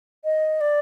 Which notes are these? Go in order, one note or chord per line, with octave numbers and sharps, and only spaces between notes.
D#5
D5